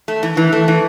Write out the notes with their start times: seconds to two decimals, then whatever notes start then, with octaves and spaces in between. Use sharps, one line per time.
0.08 A3
0.23 E3
0.37 E3
0.53 A3
0.68 E3